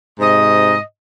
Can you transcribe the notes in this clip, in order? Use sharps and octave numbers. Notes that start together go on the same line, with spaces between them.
G#2 C3 D#5